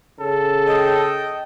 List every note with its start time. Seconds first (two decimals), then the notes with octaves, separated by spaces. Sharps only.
0.20 C#3 A4
0.67 D#5 G5